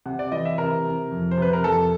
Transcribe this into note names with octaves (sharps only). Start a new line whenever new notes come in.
C3 F#5
D5
E3 D#5
E5
C3 A#4
C3
F2
C5
C3 B4
A#4
F2 A4